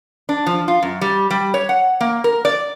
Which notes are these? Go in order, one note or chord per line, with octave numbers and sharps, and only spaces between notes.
D4
F3
F4
F#2
G3
G3
C#5
F#5
A#3
A#4
D5